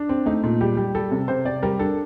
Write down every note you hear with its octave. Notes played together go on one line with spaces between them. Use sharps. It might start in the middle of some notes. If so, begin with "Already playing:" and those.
Already playing: D4
C4
A3 D#4
A#2
G3 G4
G3
G3 A4
C3
C3 C5
C3 D5
G3 A#4
D4 A4